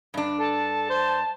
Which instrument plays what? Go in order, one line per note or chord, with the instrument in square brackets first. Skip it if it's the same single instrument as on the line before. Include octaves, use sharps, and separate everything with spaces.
[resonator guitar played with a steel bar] G2 D4
[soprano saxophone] A4 [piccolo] A5
[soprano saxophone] C5